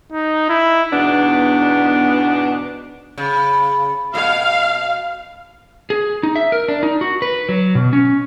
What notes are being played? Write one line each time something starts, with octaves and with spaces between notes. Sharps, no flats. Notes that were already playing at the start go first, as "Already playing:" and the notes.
D#4
E4
E2 G#2 B2 B3 D4
C#3
B2 F5
G#4
D#4
E5
A#4
D4
D#4
F#4
B4
F#3
B2
C#4